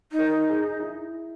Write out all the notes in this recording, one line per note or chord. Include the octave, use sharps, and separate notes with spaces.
D#4
A#4
G#4
E4